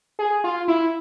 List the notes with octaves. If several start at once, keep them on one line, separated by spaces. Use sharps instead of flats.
G#4
F4
E4